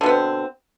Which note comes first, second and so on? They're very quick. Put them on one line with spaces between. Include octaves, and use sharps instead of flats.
D3 B2 B3 C4